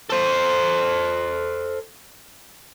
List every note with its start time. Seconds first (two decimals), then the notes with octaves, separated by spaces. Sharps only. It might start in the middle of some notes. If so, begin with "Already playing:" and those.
0.10 A4 C5